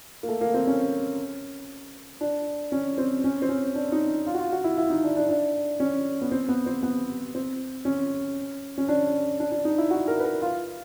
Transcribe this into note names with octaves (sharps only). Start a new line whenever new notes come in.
A#3
A3
A#3
C4
C#4
D4
C#4
C4
C#4
C4
C#4
D4
D#4
F4
F#4
F4
F#4
E4
E4
D#4
D4
D4
D4
C#4
B3
C4
B3
C4
B3
C4
C#4
C#4
D4
D4
D4
D#4
E4
F#4
A#4
B4
A#4
F4